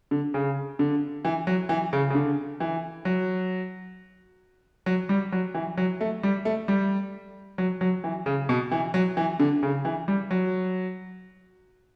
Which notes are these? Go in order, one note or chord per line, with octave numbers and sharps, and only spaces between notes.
D3
C#3
D3
E3
F#3
E3
C#3
C#3
D3
E3
F#3
F#3
G3
F#3
E3
F#3
A3
G3
A3
G3
F#3
F#3
E3
C#3
B2
E3
F#3
E3
D3
C#3
E3
G3
F#3